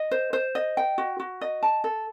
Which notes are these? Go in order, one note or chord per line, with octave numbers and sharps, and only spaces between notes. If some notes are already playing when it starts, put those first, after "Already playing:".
Already playing: D#5
C5
C5
D#5
G5
F#4
F#4
D#5
A5
A4